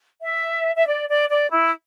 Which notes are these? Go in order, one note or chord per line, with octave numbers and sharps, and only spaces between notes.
E5
E5
D5
D5
D5
E4